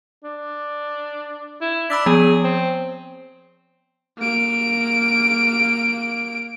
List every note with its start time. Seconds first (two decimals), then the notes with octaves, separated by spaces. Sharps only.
0.24 D4
1.61 E4
1.90 D4 B5 E6 B6
2.06 F3 B3 G#4
2.44 C4
4.18 A#3 D7